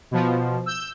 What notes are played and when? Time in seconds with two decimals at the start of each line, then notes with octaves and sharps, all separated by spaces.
0.11 B2 F3
0.66 E6 G6